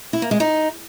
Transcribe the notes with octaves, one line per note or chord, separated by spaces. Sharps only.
E4
A#3
G#3
D#4